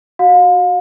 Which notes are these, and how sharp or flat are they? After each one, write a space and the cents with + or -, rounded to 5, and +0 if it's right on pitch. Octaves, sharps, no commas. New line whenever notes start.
F#4 +0 F5 +35